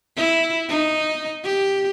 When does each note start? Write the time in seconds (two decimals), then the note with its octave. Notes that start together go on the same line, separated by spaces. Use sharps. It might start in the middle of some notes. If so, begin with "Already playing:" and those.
0.17 E4
0.69 D#4
1.44 G4